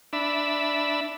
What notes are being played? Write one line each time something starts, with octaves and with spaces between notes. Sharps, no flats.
D4 E5 B5